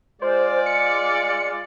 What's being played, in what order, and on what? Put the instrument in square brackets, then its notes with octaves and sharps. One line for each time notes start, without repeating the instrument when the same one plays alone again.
[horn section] G#3 F4 D5 [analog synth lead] C5
[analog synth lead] C#7